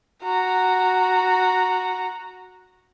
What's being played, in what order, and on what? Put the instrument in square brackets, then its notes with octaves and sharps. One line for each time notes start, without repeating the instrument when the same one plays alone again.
[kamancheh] F#4 A#5